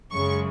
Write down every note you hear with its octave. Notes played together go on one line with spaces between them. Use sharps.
F#2 C#3 G#3 C#6